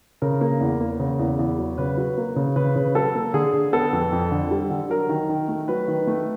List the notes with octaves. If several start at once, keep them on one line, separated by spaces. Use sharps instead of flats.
C#3 A#4
A#3
E2
A#3
C#3
E2
E2
F#3
C#3 B4
F#3
A#3
C#3
C#3 B4
C#3
F#3 A4
A#3
D3 G#4
D3
B3 A4
F2
F2
D3
G3
D3
F#3 A#4
D#3
D#3
A3
F#3 B4
D#3
A3